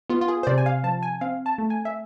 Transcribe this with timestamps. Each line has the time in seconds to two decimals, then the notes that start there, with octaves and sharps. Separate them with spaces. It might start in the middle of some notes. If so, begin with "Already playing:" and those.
0.10 B3 F4
0.21 F4
0.28 G#4
0.43 C5
0.47 C3 D5
0.58 G#5
0.66 F5
0.84 F3 A5
1.03 G#5
1.21 C4 F5
1.46 A5
1.58 A3
1.70 G#5
1.85 E5